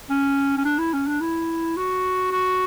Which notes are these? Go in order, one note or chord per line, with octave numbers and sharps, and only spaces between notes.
C#4
C#4
D4
E4
C#4
D4
E4
F#4
F#4